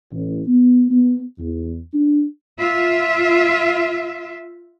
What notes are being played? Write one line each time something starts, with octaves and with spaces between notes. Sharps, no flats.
A1
B3
B3
E2
D4
F4 E5